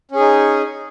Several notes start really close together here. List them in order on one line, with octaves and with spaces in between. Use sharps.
C#4 G#4 D#4